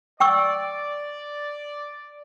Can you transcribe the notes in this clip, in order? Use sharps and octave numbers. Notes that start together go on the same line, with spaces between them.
D5 G5 C#6 E6